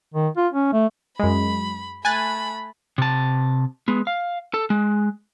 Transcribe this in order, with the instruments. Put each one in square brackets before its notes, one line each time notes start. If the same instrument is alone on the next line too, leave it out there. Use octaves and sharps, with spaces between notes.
[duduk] D#3
F4
C#4
A3
[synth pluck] F#2 G#3 [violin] B5
[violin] A3 B5 [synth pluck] G#5 F#6 A6
[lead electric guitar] C3 A5
G#3 B3
F5
A4
G#3